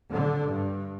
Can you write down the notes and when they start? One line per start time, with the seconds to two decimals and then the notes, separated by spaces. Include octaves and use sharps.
0.12 D3
0.49 G2